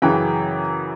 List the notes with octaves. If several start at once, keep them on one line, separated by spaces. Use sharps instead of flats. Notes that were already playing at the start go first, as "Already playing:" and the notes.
F#2 C#3 E3 G5